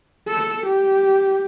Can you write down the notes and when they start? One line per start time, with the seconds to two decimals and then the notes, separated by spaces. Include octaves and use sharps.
0.28 A4
0.66 G4